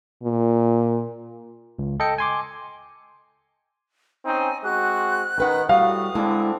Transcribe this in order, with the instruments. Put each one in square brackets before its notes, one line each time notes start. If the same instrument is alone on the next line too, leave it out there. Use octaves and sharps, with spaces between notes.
[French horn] A#2
[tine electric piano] C#2
A4 D#5 G5 C#7
G#5 C6 D6
[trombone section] C4 C#4 D#4 [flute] G#5
[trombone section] G#3 C4 F#4 [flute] F#6
[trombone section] D#3 [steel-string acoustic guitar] C#4 B4 F#5
[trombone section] A2 F#4 [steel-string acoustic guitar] G3 [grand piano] F5 [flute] D#6
[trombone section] D3 C4 D4 [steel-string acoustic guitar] G#3 E4